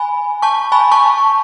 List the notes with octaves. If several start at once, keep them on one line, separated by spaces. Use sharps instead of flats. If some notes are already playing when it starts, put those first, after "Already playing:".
Already playing: G#5 B5
A5 C#6
G#5 B5
A5 C#6